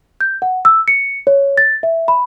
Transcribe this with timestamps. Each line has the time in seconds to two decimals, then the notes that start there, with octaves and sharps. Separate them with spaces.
0.21 G6
0.42 F#5
0.65 E6
0.88 C#7
1.27 C#5
1.58 A6
1.83 E5
2.08 B5